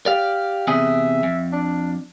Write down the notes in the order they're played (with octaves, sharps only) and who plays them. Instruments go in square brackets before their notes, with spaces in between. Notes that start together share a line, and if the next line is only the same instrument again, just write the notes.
[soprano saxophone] G4 [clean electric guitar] D5 F5
[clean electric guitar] E2 C3 G#4 [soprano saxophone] E5
[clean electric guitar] F2
[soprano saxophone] D4